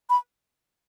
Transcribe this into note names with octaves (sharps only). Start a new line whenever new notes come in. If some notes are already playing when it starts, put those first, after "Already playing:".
B5